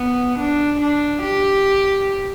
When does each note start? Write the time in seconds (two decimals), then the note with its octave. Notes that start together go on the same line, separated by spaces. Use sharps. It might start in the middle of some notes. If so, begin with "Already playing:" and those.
Already playing: B3
0.39 D4
0.81 D4
1.23 G4